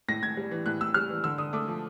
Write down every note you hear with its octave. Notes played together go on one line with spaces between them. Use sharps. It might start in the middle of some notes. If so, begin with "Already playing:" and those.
A2 A#6
A2 G#6
G3
E3
A2 F#6
A2 E6
G3 F6
E3
D3 E6
D3 D#6
A3 D6
F3